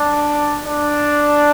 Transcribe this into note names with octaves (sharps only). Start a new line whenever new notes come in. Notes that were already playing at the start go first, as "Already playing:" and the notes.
Already playing: D4
D4